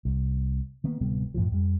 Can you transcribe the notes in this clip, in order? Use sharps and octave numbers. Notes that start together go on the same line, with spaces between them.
C2
D#3 A#3 B3
D1 C3 G3 B3
F#2 A2 E3 F3
F2 G3